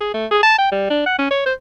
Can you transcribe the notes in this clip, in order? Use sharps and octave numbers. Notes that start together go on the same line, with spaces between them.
G#4
A3
G#4
A5
G5
G3
D4
F#5
C#4
C#5
C5